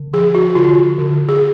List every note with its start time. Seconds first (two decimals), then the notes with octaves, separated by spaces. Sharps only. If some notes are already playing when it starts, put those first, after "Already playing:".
Already playing: D3
0.13 F3 G#4
0.35 F#4
0.55 D3 F4
0.98 D3
1.29 G#4